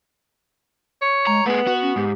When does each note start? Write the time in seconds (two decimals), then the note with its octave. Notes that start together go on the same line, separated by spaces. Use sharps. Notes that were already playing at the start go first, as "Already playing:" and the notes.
1.01 C#5
1.27 G#3 A#5
1.46 A3 B3 G#4 B4
1.67 F#4
1.82 C#4
1.96 G#2 G4